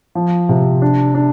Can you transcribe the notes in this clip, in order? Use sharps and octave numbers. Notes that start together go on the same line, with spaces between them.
F3
C3
D4
D4